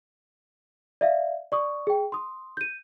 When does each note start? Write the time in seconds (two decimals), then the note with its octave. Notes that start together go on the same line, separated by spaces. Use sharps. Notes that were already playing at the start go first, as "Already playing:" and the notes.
1.01 D5 E5 F5
1.52 D5 C#6 D#6
1.87 G#4 G5
2.12 C6 D#6
2.57 G6 D#7